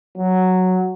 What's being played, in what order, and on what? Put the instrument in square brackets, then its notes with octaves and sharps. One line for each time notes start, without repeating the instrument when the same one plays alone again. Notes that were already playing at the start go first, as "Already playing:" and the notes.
[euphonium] F#3